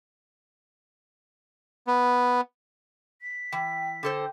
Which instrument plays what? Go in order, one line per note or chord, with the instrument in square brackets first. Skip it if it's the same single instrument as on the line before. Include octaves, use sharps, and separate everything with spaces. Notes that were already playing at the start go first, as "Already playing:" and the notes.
[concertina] B3
[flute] B6
[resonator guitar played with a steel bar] E3 [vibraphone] G5
[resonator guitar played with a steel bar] D3 A4 C5 [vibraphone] G5